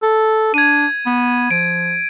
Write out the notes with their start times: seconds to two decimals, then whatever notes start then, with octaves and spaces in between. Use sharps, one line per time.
0.03 A4
0.54 D4 G#6 D#7
1.06 B3
1.51 F3 D7